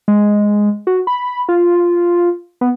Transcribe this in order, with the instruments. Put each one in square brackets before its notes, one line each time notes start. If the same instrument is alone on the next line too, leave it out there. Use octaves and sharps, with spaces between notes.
[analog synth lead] G#3
F#4
B5
F4
B3